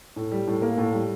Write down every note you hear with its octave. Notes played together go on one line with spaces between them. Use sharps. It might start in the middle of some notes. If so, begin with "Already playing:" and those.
A2
G3
A2
A#3
A2
G3